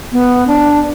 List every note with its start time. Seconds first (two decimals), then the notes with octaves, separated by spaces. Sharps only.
0.12 B3
0.47 D4